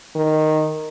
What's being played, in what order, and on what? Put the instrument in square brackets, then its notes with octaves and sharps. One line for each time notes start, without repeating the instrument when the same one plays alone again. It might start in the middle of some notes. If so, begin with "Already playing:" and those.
[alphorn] D#3